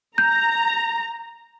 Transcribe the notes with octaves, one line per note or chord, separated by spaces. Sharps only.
A#5 G6